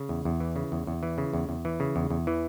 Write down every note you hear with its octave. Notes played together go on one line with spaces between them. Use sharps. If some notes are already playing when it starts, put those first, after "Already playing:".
Already playing: C#3
E2
E2
E3
C#3
E2
E2
E3
C#3
E2
E2
E3
C#3
E2
E2
E3